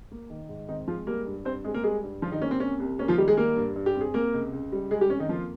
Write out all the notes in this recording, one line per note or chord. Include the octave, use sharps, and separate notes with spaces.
A#3
D#3
G#2
D#3 C4 D#4
F3 G#3 F4
G3 A#3 A#4
G2
G2 C4 C5
G#3 C4 G#4
A#3 A#4
G3 G#3 G#4
G2
G2 F3 F4
D#3 D#4
A#3 C#4
C4
C3 C#4
C2
A#3 C#4
F3 F4
D#3 G3 G4
G#3 G#4
G3 A#3 A#4
G2
G2
G4
C4
G#4
C3 A#3 A#4
C#2
C#2
G3
C#3 G#3 G#4
G3 G4
F2 C#4
D#3 D#4
F3 A#3 F4